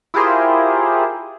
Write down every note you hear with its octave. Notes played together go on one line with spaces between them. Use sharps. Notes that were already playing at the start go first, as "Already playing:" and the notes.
E4 F4 G4 G#4 A#4 C5